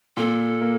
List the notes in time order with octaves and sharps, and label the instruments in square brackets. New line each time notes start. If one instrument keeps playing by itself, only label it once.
[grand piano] A#2 [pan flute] A4
[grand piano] A#3